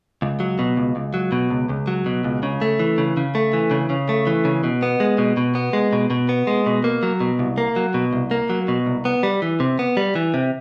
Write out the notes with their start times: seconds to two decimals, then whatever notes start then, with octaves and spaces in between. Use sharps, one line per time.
0.22 C#2
0.40 F#3
0.59 B2
0.77 C#2
0.96 C#2
1.14 F#3
1.32 B2
1.50 C#2
1.69 C#2
1.87 F#3
2.06 B2
2.24 C#2
2.43 C#3
2.62 A3
2.79 E3
2.98 C#3
3.17 C#3
3.35 A3
3.53 E3
3.71 C#3
3.90 C#3
4.09 A3
4.27 E3
4.45 C#3
4.64 B2
4.82 B3
5.00 G#3
5.18 B2
5.37 B2
5.55 B3
5.73 G#3
5.93 B2
6.10 B2
6.29 B3
6.47 G#3
6.66 B2
6.84 A#3
7.03 F#3
7.20 B2
7.39 C2
7.58 A#3
7.76 F#3
7.94 B2
8.13 C2
8.31 A#3
8.50 F#3
8.68 B2
8.86 C2
9.05 B3
9.23 G3
9.42 E3
9.60 C3
9.79 B3
9.97 G3
10.15 E3
10.34 C3